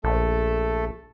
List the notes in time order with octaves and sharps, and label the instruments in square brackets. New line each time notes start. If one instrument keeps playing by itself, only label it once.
[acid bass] A#1 [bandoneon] A3 A4